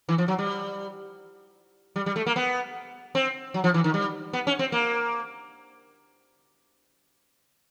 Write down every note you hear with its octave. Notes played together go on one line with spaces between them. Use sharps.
E3
F3
F#3
G3
G3
G3
A3
A#3
B3
C4
F#3
F3
E3
D#3
G3
B3
C#4
C4
A#3